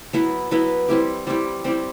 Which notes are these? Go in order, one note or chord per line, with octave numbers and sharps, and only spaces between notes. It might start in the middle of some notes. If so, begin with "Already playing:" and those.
F#3 B3 E4 B4
F#3 B3 E4 B4
G3 C4 E4 G4
G3 C4 E4 G4
G3 C4 E4 G4